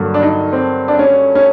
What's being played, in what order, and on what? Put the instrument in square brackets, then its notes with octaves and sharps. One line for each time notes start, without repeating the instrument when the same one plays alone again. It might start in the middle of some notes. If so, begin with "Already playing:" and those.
Already playing: [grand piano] G2 D3 F#3 A#3
[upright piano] D4
D#4
C4
D4
C#4
C#4